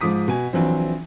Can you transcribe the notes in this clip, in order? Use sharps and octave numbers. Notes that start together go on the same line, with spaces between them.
G#2 F3 D6 D#6 B6
B2 G#5
A#1 E3 F#3 C4